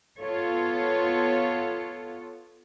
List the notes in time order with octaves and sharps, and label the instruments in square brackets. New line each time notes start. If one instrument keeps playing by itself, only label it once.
[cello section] B3 F4 A4 C#5